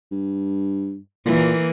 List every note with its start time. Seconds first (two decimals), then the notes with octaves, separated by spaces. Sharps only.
0.11 G2
1.26 A#2 E3 A#3